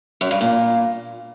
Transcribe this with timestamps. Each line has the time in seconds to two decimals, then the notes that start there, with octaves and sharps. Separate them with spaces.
0.21 F#2
0.31 G2
0.41 A#2